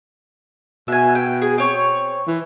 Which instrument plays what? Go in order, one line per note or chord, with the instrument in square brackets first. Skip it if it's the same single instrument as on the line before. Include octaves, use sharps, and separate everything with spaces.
[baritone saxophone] B2 [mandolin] E5 G#5
[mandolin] G5
G#4
C4 C#5
[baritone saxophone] E3